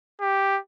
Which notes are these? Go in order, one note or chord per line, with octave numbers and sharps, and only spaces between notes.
G4